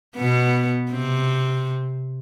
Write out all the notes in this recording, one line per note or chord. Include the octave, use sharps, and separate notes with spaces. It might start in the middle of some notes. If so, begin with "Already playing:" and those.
B2 B3
C3 C4